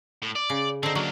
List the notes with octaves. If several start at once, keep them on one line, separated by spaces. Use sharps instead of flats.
A2
D5
C#3
D3 C4 D#4
F#3 A#3 D4